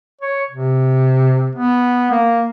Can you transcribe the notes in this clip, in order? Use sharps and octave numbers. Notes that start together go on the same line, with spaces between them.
C#5
C3
B3
A#3